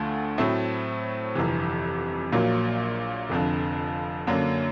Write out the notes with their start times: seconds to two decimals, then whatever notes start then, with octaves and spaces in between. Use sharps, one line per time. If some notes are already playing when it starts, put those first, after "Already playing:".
Already playing: D2 D3 F3 A3
0.38 A2 F#3 A3 C4 E4
1.35 G1 F2 C3 E3
2.32 A#1 A#2 F#3 A#3
3.30 F1 F2 D3 F3
4.27 F#2 D3 F#3 A#3 D4